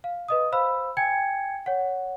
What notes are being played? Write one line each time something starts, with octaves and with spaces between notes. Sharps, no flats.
F5
B4 D#5 D#6
C5 F5 B5 E6
G5 G#5 G#6 C#7
C#5 F#5